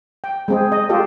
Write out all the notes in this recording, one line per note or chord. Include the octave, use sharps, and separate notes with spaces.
G5
G#3 C4 G#4
D#5
F4 G4 A4 D#5